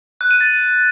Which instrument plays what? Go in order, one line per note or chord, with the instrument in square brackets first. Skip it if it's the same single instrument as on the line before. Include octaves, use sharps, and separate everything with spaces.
[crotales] F#6
D#7
A6